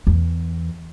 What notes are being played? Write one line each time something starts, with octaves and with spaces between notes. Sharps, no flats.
E2